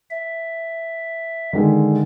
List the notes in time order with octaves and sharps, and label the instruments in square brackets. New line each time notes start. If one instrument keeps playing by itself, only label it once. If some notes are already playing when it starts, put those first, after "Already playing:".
[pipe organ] E5
[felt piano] D3 D#3 G#3